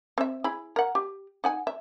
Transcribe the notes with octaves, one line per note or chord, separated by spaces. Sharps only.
C4 E5
E4 G#4 B5
A#4 F#5
G4
D#4 F#5 G#5
E5